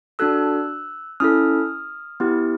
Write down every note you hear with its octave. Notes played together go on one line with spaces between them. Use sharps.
D4 F#4 A4 E6 F#6
C#4 E4 A4 D#6 F6
B3 E4 G4